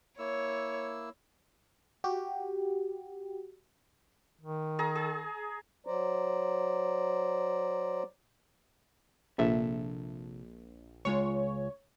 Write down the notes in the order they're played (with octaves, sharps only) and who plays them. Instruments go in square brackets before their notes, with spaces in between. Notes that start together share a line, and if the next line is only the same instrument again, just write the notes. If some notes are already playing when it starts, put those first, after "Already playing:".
[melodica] A#3 E4 E6 [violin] C#5
[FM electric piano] F#4 G4
[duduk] D#3
[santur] G#4 A#5
G#4
[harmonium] F#3 C5 D5 A#5
[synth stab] A#1 [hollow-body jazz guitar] C3 A4 E5
[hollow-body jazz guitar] C#2 G#3 F4 [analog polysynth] C#5